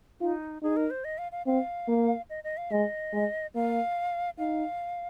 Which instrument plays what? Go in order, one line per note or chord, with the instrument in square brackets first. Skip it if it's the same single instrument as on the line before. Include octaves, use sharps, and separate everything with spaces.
[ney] D#4 [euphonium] F4
[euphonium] D#4 [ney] G#4
[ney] A#4
C5
D#5
F5
F5
[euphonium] C4 [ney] F5
[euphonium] A#3
[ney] D#5
D#5
F5
[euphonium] G#3 [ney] D#5
[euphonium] G#3
[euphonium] A#3 [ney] F5
[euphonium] D#4 [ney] F5